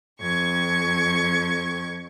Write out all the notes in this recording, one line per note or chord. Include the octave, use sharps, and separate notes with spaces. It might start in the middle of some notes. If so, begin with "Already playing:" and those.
F2 C#6 G#6